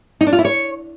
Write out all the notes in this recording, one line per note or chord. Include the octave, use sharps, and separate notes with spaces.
D#4
D4
F4
E4
C#5